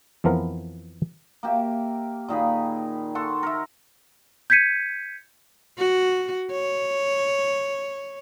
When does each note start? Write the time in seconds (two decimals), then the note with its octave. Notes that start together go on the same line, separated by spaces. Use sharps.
0.24 F2 E3 F3 B3 A#4 B4
1.43 A#3 G4 E5
2.28 A#2 D#3 G#4 B5
3.15 A4 F#5 C6 C#6
3.43 A#4 E5
4.50 G6 G#6 B6 C#7 D#7
5.78 F#4
6.52 C#5